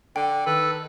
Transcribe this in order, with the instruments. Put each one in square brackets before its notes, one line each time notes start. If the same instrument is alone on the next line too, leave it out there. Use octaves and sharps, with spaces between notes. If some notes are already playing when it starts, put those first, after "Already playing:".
[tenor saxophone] D3 [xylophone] G5
[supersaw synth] D#3 [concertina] A4 [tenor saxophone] B4